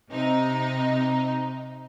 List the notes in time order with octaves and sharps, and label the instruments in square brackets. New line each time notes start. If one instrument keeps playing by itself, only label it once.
[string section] C3 D#4